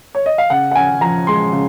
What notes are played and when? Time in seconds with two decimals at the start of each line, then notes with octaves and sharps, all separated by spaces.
0.15 C#5
0.26 D#5
0.38 F5
0.50 C#3 F#5
0.71 F#5
0.75 C#4 G#5
1.01 F3 A#5
1.27 G#3 C6
1.52 C#3